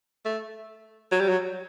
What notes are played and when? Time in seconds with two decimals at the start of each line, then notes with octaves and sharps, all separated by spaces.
0.25 A3
1.12 F#3
1.21 G3
1.29 F#3